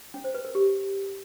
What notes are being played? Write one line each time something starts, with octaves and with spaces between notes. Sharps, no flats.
C#4
C5
B4
A#4
G4